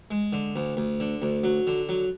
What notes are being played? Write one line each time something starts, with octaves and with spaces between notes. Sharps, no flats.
G#3
D3
D2
D2
D3
D2
F#3
D3
F#3